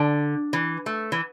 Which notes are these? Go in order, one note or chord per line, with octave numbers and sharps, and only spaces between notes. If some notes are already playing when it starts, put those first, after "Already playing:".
Already playing: D3
E3
A3
E3